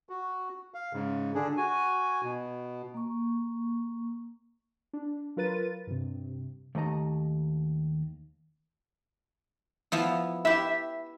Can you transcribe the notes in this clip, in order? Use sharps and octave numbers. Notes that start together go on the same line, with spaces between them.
F#4
F5
G#2 C#3
D3 D4 G#4
F#4 G#5
B2
A#3 C#6
D4
F#3 F4 A#4 B4 A6 D#7
G2 C3
D#2 A3 D#4 D#5 A#5
F3 B3 E4
E4 G4 E5